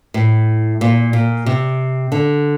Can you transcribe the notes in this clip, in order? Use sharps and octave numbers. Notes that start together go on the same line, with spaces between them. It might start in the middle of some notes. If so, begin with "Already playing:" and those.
A2
A#2
A#2
C3
D3